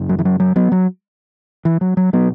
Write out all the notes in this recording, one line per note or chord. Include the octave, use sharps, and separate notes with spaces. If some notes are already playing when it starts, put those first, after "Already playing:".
Already playing: F#2 C#3
F#3
E3
F#3
F#3
F#3 B3
F#3
E3
F#3
F#3
B2 F#3 B3